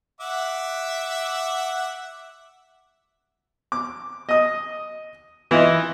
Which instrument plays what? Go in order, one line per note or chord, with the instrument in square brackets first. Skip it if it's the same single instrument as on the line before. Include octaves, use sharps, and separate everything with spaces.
[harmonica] E5 F#5 D6
[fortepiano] D6
D#5 D#6
E3 E4 F4 D#5